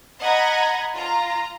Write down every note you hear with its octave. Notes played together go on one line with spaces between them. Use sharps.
D#5 F#5 A#5 B5 G#6 A#6
F4 A#5